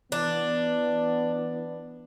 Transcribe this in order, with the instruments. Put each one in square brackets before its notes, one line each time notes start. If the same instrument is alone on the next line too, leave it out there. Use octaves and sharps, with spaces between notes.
[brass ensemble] E3 B3 [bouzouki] D4